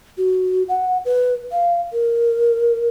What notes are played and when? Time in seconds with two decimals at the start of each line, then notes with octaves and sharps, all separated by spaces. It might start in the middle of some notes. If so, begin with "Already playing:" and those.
0.18 F#4
0.69 F#5
1.05 B4
1.52 F5
1.93 A#4